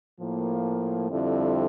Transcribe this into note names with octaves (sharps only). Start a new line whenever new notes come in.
A2 F3 A#3
F2 D3 G3 C4 E4